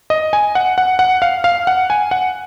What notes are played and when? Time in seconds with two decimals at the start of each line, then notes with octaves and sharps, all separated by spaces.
0.10 D#5
0.33 G#5
0.55 F#5
0.78 F#5
0.99 F#5
1.22 F5
1.44 F5
1.67 F#5
1.90 G#5
2.11 F#5